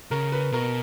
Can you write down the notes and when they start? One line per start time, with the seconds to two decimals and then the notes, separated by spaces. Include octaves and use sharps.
0.11 C#3 A#4
0.32 B4
0.52 B2 A#4